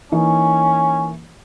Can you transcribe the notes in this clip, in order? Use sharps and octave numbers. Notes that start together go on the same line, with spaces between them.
E3 A#3 C#4 D#4